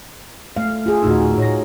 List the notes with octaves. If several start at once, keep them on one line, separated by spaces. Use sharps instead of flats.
A3 F5
F4 G#4
D2 A2 D#4 F#4 E6
A2 C#5 A#5 A#6